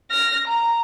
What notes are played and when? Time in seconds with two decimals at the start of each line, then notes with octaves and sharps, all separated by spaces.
0.11 F6 A#6
0.47 A#5